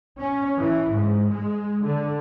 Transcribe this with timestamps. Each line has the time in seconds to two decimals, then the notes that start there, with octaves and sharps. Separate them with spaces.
0.18 C#4
0.56 E3
0.92 G#2
1.30 G#3
1.84 D3